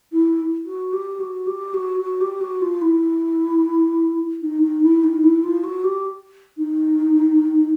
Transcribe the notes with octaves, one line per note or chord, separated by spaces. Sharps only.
E4
F#4
G4
F#4
G4
F#4
F#4
G4
F#4
F4
E4
D#4
D#4
E4
D#4
E4
F4
F#4
G4
D#4